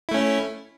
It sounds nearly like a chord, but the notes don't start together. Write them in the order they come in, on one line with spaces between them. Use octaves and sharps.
E4 A3 C#4